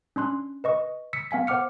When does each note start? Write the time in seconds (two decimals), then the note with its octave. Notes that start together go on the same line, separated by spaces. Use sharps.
0.16 C#4 D4 C6 F#6
0.64 B4 D#5 C#6
1.13 E6 B6 C#7
1.31 B3 F5 G#5 B6
1.47 C5 F#5 D6 F6 C#7